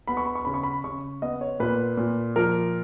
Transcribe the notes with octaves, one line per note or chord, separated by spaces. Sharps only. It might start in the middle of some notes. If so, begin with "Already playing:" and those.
B3 B5
C#6
B5
C#6
C#3 B5
C#6
B5
C#3 C#6
B3 D#5
C#5
A#2 B4
A#2
F3 A#4